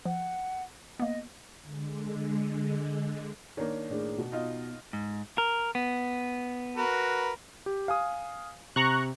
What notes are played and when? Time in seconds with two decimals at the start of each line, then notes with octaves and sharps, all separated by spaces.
0.06 F3 F#5
0.99 A#3 B3 D#5
1.62 D3 G#3
3.57 D#3 A#3 D4 C#5
3.90 A2 D4 G#4
4.18 B2
4.32 B3 D#4 F4 D#5
4.93 G#2
5.38 A#4
5.75 B3
6.77 F#4 A#4 B4
7.66 G4
7.88 F5 G#5 D#6
8.76 C3 A#5 C#6 F#6